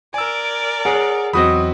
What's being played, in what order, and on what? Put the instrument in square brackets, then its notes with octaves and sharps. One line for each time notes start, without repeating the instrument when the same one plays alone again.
[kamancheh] A#4 D5 [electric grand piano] G#5 E6
[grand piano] G#4 [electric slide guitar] C#5 F#5
[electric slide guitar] E2 F#3 D#5 [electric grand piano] C4 F#4 B5 [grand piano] D#6